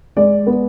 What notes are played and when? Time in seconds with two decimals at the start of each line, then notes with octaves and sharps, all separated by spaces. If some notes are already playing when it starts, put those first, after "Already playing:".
0.16 G#3 D5
0.47 B3